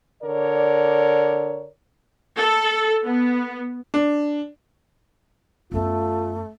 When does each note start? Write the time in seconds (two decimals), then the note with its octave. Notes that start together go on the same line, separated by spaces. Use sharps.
0.23 D3 A#4 C#5 D5
2.37 A4
3.04 B3
3.94 D4
5.72 F#2 A3 B3 F4